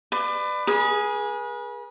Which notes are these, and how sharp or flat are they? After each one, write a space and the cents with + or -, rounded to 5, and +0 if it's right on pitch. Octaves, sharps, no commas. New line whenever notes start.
B4 +25 D5 +30
G#4 +0 B4 -40